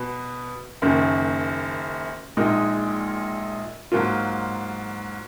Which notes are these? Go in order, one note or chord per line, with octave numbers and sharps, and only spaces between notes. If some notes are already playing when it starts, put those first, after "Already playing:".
Already playing: B2 B4
F#1 F#2 D#3 A#3
A#1 A#2 G#3 D#4 A#4
G#2 F#3 A#3 F4